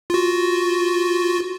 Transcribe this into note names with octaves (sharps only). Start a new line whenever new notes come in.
F4 F#4